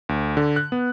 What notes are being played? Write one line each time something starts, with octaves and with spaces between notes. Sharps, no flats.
D2
D3
F#6
B3